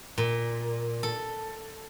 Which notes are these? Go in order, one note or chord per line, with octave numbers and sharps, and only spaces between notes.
A#2
A4